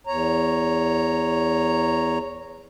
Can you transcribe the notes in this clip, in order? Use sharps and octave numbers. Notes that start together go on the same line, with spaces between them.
E2 C#5 A#5